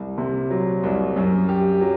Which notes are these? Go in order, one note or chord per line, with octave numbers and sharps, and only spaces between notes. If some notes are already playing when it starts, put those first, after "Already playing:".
Already playing: C2
C3
F#3
C2
F#2
G4
F#3